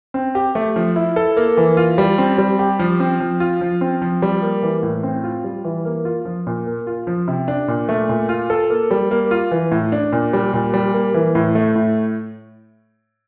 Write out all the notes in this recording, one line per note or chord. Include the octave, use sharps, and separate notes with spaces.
C4
G4
A3
F3
E4
A4
A#3
E3
F4
G3
C4
G3
G4
F3
C4
F3
F4
F3
C4
F3
G3
A#3
E3
A2
C4
F4
G3
E3
A#3
F4
F3
A#2
A#3
F4
F3
C3
D4
A#2
A3
A#2
F4
A4
A#3
G3
A#3
F4
E3
A2
D4
A#2
G3
A#2
G3
A#3
E3
A2
A3
A2